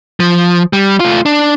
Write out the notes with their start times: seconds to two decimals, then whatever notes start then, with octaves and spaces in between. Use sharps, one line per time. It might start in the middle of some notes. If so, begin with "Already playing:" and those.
0.20 F3
0.73 G3
1.00 A3 F4
1.26 D4